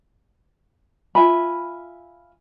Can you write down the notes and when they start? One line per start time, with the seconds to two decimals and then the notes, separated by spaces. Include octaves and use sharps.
1.15 F4 E5 G#5 B5